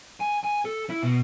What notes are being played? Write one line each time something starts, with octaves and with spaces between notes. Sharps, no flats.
G#5
G#5
A4
E4
B2